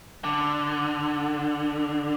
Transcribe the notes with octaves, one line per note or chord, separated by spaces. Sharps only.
D3